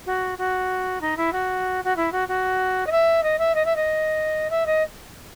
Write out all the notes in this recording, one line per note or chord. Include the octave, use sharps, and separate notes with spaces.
F#4
F#4
D#4
E4
F#4
F#4
E4
F#4
F#4
D#5
E5
D#5
E5
D#5
E5
D#5
E5
D#5